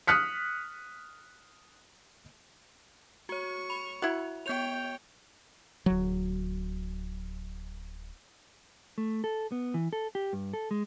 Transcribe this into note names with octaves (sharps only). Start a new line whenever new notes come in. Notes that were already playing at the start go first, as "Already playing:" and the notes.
D#6 F6 F#6 B6 C#7
F#4 C#5 C#6
B5 F7
E4 F#4 F#5
B3 C#5 G5 G6 F7
D1 F#3
A3
A4
B3
E3
A4
G4
G2
A4
G#3